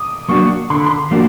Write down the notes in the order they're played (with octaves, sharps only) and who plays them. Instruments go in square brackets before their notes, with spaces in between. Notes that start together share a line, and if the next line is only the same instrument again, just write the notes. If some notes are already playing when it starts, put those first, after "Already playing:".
Already playing: [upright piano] D6 D#6
[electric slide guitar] F#3 A#3 D4 F#4 [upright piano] C#6
[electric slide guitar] D3 [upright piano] C6
[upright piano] B5
C6
[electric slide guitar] F3 A#3 D4 F#4